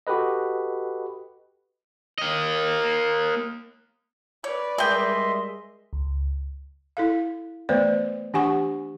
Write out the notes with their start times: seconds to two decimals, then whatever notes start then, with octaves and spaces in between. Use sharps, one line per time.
0.07 F#4 G4 A4 B4 D#5
2.18 A#3 D#5
4.44 B4 C#5 D5
4.78 G3 G#3 G#4 A#4 D#5 E5 G5 C6
5.93 C#2
6.97 E4 A4 F5
7.69 E3 A3 B3 B4 C5 D5
8.33 E3 D4 G4 F#5 G#5 C#6